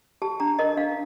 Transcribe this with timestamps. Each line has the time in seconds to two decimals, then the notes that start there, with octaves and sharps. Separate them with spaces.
0.22 G4 A5
0.40 D4 A#5
0.59 A#4 D#5
0.77 D4 F5